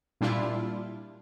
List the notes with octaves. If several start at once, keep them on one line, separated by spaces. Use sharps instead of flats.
A#2 G3 D4 E4 F4